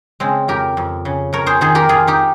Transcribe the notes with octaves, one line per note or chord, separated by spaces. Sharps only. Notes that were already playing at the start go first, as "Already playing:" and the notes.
C#3 G#3 C4
F2 G4 A#4
F2
C#3
F2 A#4 C#5
G#4 C5
D#3 G#4 C5
G4 A#4
F2 F4 G#4
D#4 G4